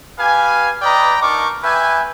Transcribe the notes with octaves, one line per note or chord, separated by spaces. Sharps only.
G4 B4 F5 G#5
B4 D5 D#5 G5 A#5
D4 D#4 A#4 C#6 D6
B4 E5 G5 G#5